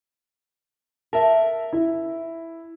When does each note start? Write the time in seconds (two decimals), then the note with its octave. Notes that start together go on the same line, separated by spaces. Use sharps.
1.13 A#4 E5 A5
1.73 E4